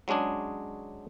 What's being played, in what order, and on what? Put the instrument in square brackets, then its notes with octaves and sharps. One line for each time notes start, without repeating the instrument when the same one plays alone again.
[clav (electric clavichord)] F#3 G#3 C#4 D4 G#4